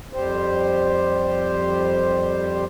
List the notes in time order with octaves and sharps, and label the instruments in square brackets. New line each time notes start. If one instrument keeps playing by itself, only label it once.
[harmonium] F2 G3 G4 C5